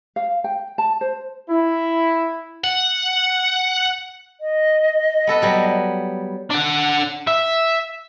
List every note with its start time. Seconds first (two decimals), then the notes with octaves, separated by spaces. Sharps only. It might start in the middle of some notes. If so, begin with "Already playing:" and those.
0.16 F5
0.44 G5
0.78 A5
1.01 C5
1.49 E4
2.64 F#5
4.41 D#5
5.27 B3 A4 B4
5.42 F#3 G3 B3
6.51 D4 F#5
7.27 E5